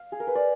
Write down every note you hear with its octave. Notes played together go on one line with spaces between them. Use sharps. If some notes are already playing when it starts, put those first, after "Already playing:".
Already playing: F5
G#4
A#4
B4
D5